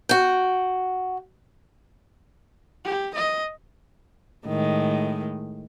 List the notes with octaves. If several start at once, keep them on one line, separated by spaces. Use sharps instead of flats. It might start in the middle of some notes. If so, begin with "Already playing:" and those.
F#4 G5
G4
D#5
A2 D#3 G#3